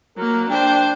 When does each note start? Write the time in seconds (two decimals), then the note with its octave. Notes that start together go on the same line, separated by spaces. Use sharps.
0.17 F#3 A#3 A#4
0.49 D4 C5 G5